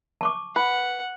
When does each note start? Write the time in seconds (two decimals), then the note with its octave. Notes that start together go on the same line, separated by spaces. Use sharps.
0.21 A5 C#6 D6
0.56 B4 F#5